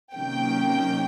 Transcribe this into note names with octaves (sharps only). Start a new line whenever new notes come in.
C3 D#3 F#3 A#3 C#4 G5